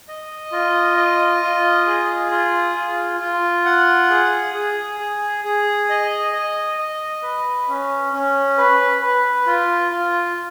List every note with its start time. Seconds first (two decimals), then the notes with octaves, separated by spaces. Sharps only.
0.08 D#5
0.52 F4
0.97 D#5
1.42 F4
1.87 G#4
2.31 F4
2.76 F4
3.20 F4
3.65 F#5
4.10 G#4
4.54 G#4
5.00 G#4
5.45 G#4
5.89 D#5
6.33 D#5
6.79 D#5
7.22 B4
7.68 C#4
8.13 C#4
8.58 B4
9.02 B4
9.47 F4
9.91 F4